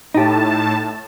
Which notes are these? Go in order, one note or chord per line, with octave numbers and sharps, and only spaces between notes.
A2 D#4 G4 A5